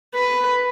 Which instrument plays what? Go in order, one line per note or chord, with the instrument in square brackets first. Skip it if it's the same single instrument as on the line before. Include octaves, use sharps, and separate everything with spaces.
[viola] B4